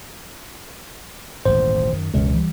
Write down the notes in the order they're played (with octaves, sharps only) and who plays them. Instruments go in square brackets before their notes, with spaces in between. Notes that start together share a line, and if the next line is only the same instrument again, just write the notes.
[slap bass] D#1 A1 G#2 [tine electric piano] C5
[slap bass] F#2 D#3
[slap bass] E1 F#2 C#4 [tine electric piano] C#2
[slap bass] E3 G3